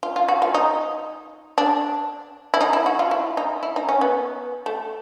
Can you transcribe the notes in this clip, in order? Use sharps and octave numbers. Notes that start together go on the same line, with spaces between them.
F4
F4
F#4
F4
D#4
D4
E4
D#4
E4
F#4
F4
E4
D#4
E4
D#4
C#4
B3
A3